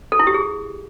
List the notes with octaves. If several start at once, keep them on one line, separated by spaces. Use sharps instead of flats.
A4
E4
G4
G#4